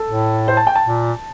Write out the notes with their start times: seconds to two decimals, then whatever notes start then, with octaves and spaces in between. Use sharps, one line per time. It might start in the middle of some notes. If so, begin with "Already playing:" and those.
Already playing: A4
0.09 A2
0.48 C5
0.57 A5
0.67 G5
0.75 A5
0.86 A#2